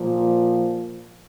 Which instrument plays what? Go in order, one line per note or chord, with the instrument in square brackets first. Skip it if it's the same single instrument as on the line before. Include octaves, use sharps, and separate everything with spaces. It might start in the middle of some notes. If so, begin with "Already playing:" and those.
Already playing: [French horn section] A#2 F3